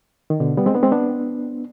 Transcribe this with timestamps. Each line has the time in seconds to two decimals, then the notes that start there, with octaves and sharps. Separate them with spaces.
0.30 D#3
0.40 B2 D3
0.57 G3 B3
0.66 G#3 C4
0.74 B3 D4
0.83 G#3 C4
0.92 B3 D4